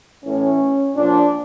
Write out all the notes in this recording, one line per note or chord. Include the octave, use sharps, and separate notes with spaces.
A2 E3 C#4
A#2 F3 D4